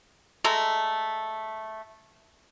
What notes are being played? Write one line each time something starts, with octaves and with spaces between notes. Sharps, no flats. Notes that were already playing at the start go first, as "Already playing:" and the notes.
G#3 A3 A4 A#5